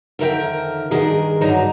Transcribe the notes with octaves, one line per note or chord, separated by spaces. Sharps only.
F2 D3 D#3 A#4 E5 G5
G2 D#3 D4 G#4 A#4
G2 D3 F#3 D#4 A#5